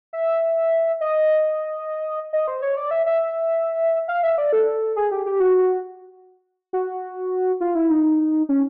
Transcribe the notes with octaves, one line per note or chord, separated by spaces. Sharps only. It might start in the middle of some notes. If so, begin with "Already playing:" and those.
E5
D#5
D#5
C5
C#5
D5
E5
E5
F5
E5
D5
A4
G#4
G4
G4
F#4
F#4
F4
E4
D#4
C#4